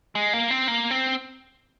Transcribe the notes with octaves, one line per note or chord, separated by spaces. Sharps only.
G#3
A#3
C4
A#3
C4